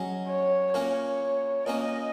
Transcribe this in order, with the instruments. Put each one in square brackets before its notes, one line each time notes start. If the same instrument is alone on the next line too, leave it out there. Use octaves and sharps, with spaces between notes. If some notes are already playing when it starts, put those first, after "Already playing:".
Already playing: [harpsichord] F#3 C#4 G#4 D#5
[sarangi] C#5
[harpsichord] A#2 A#3 C#4 A#4 [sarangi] C#5
[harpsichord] A#2 A#3 C#4 A#4 [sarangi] D#5